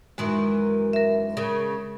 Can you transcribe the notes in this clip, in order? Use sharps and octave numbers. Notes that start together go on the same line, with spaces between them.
F#2 D#3 E3 G#3
A#4 E5
C#3 A#4